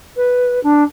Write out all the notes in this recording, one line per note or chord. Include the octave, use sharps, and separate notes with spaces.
B4
D4